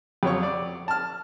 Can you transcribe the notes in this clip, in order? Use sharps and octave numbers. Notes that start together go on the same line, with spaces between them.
F2 F#3 C#5 C#6
D5
A5 F6